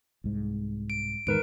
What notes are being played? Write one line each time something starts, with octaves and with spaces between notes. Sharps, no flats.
C2 G#2
D7
E2 G#2 D#3 A#4 B4 D7